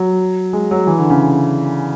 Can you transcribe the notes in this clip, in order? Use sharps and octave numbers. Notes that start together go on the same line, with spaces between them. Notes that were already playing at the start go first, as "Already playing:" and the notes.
Already playing: F#3
G#3
F#3
E3
D3
C#3